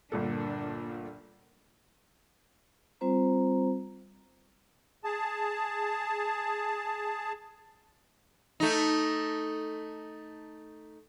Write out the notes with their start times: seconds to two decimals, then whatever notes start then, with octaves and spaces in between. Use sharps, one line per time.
0.12 G1 A#2 A#3 D4 A4
3.01 G3 C4 F4 C5 A#5
5.04 G#4 A5
8.60 A3 D#4